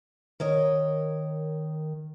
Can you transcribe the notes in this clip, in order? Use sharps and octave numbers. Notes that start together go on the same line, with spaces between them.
D#3 A#4 C#5 D#5